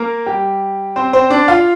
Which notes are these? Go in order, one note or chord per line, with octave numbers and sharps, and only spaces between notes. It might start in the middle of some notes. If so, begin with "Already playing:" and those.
Already playing: A#3 A#4
G3 G4
C4 C5
C4 C5
D4 D5
F4 F5